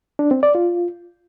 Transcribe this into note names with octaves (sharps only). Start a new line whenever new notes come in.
D4
C4
D5
F4